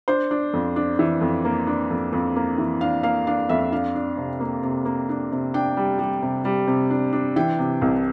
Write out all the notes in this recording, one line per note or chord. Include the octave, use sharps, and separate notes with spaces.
D4 C5
D4
F2
D4
E3
F2
A#3
D4
F2
F2
A#3
E3
D4 F5
A#3 F5
D4 F5
F2 E5
D4 F5
D4
C3
A#3
C3
A#3
D4
C3
D4 G5
G3
G3
C3
G3
C3
D4
D4
E3 G5
C3
C2